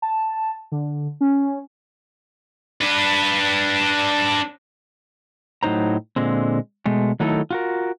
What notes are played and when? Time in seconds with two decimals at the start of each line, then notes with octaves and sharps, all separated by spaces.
0.02 A5
0.72 D3
1.21 C#4
2.81 D4 B4
5.63 A2 F#3 D#4 C5 A#5
6.16 A#2 D3 G#3 C4
6.86 B2 G#3 A3
7.20 D#3 F#3 A3 D#4 E4 A4
7.51 F4 F#4 A#4